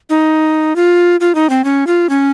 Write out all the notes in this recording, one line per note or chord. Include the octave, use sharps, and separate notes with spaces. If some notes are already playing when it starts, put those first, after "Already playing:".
D#4
F4
F4
D#4
C4
C#4
F4
C#4